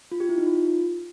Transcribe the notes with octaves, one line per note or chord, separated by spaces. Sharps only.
F4
G4
E4
D#4
F4